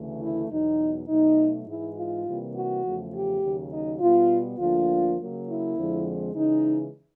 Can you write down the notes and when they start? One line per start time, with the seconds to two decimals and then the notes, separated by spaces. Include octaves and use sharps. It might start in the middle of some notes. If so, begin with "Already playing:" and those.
Already playing: D2 C#3 E3 A3
0.20 E4
0.50 E2 B2 F#3 D#4
1.08 B2 F#3 A3 D#4
1.66 G#2 E3 G#3 E4
1.96 F4
2.26 C3 E3 G3 A#3
2.55 F#4
2.84 E2 C#3 F3 A3
3.13 G4
3.42 D#2 C#3 F#3
3.71 D#4
4.00 B2 G3 B3 F4
4.59 D2 D3 F3 A#3 D4 F4
5.18 C#3 F#3 A#3
5.47 E4
5.75 F2 D3 F3 G#3 C4
6.34 C#3 E3 G#3 D#4